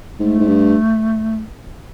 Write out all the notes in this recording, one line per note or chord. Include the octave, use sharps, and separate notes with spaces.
G#2 A3
G#2
G2